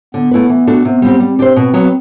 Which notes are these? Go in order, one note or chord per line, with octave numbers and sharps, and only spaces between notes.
D3 B3
A3 E4 B4
E3
A3 D4 F#4 A4
C3 B3
G3 C4 G4
G3 C4
D4 G4 C5
B2
F#3 B3